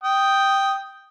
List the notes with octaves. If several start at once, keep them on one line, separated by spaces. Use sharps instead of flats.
G5 D#6